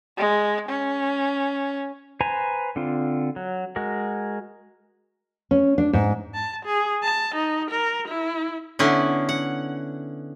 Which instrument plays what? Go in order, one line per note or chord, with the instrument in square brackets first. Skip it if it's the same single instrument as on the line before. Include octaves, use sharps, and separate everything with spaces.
[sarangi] G#3
C#4
[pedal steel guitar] B4 C5 G#5 A#5
D3 C4 F4
F#3
G#3 F#4 A#4
[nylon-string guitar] C#4
D4
G#2
[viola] A5
G#4
A5
D#4
A#4
E4
[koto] D3 B3 C#4 E4
F#5